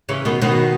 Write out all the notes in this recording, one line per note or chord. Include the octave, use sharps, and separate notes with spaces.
C#3 E3
B2 D#3
B2 D#3